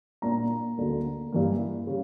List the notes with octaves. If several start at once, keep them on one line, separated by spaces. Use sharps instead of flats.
A#2 A#3 D4 A#5
D2 D3 A#3
G2 E3 A#3
C#3 G3